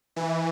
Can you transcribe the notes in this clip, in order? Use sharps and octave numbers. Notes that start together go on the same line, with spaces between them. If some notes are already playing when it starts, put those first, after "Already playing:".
E3